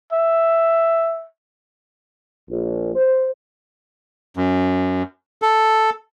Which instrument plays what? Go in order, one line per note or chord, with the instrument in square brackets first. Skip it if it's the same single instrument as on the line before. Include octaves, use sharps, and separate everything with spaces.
[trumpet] E5
[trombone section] A#1
C5
[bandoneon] F#2
A4